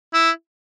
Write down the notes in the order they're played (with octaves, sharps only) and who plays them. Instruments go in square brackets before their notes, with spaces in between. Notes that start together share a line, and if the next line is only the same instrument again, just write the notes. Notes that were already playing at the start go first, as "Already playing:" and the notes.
[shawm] E4